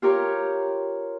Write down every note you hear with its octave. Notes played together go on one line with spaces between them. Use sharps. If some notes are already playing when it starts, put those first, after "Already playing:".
F4 G4 A#4 C#5